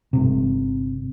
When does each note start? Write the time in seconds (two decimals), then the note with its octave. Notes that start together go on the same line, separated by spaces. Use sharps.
0.13 G1 C3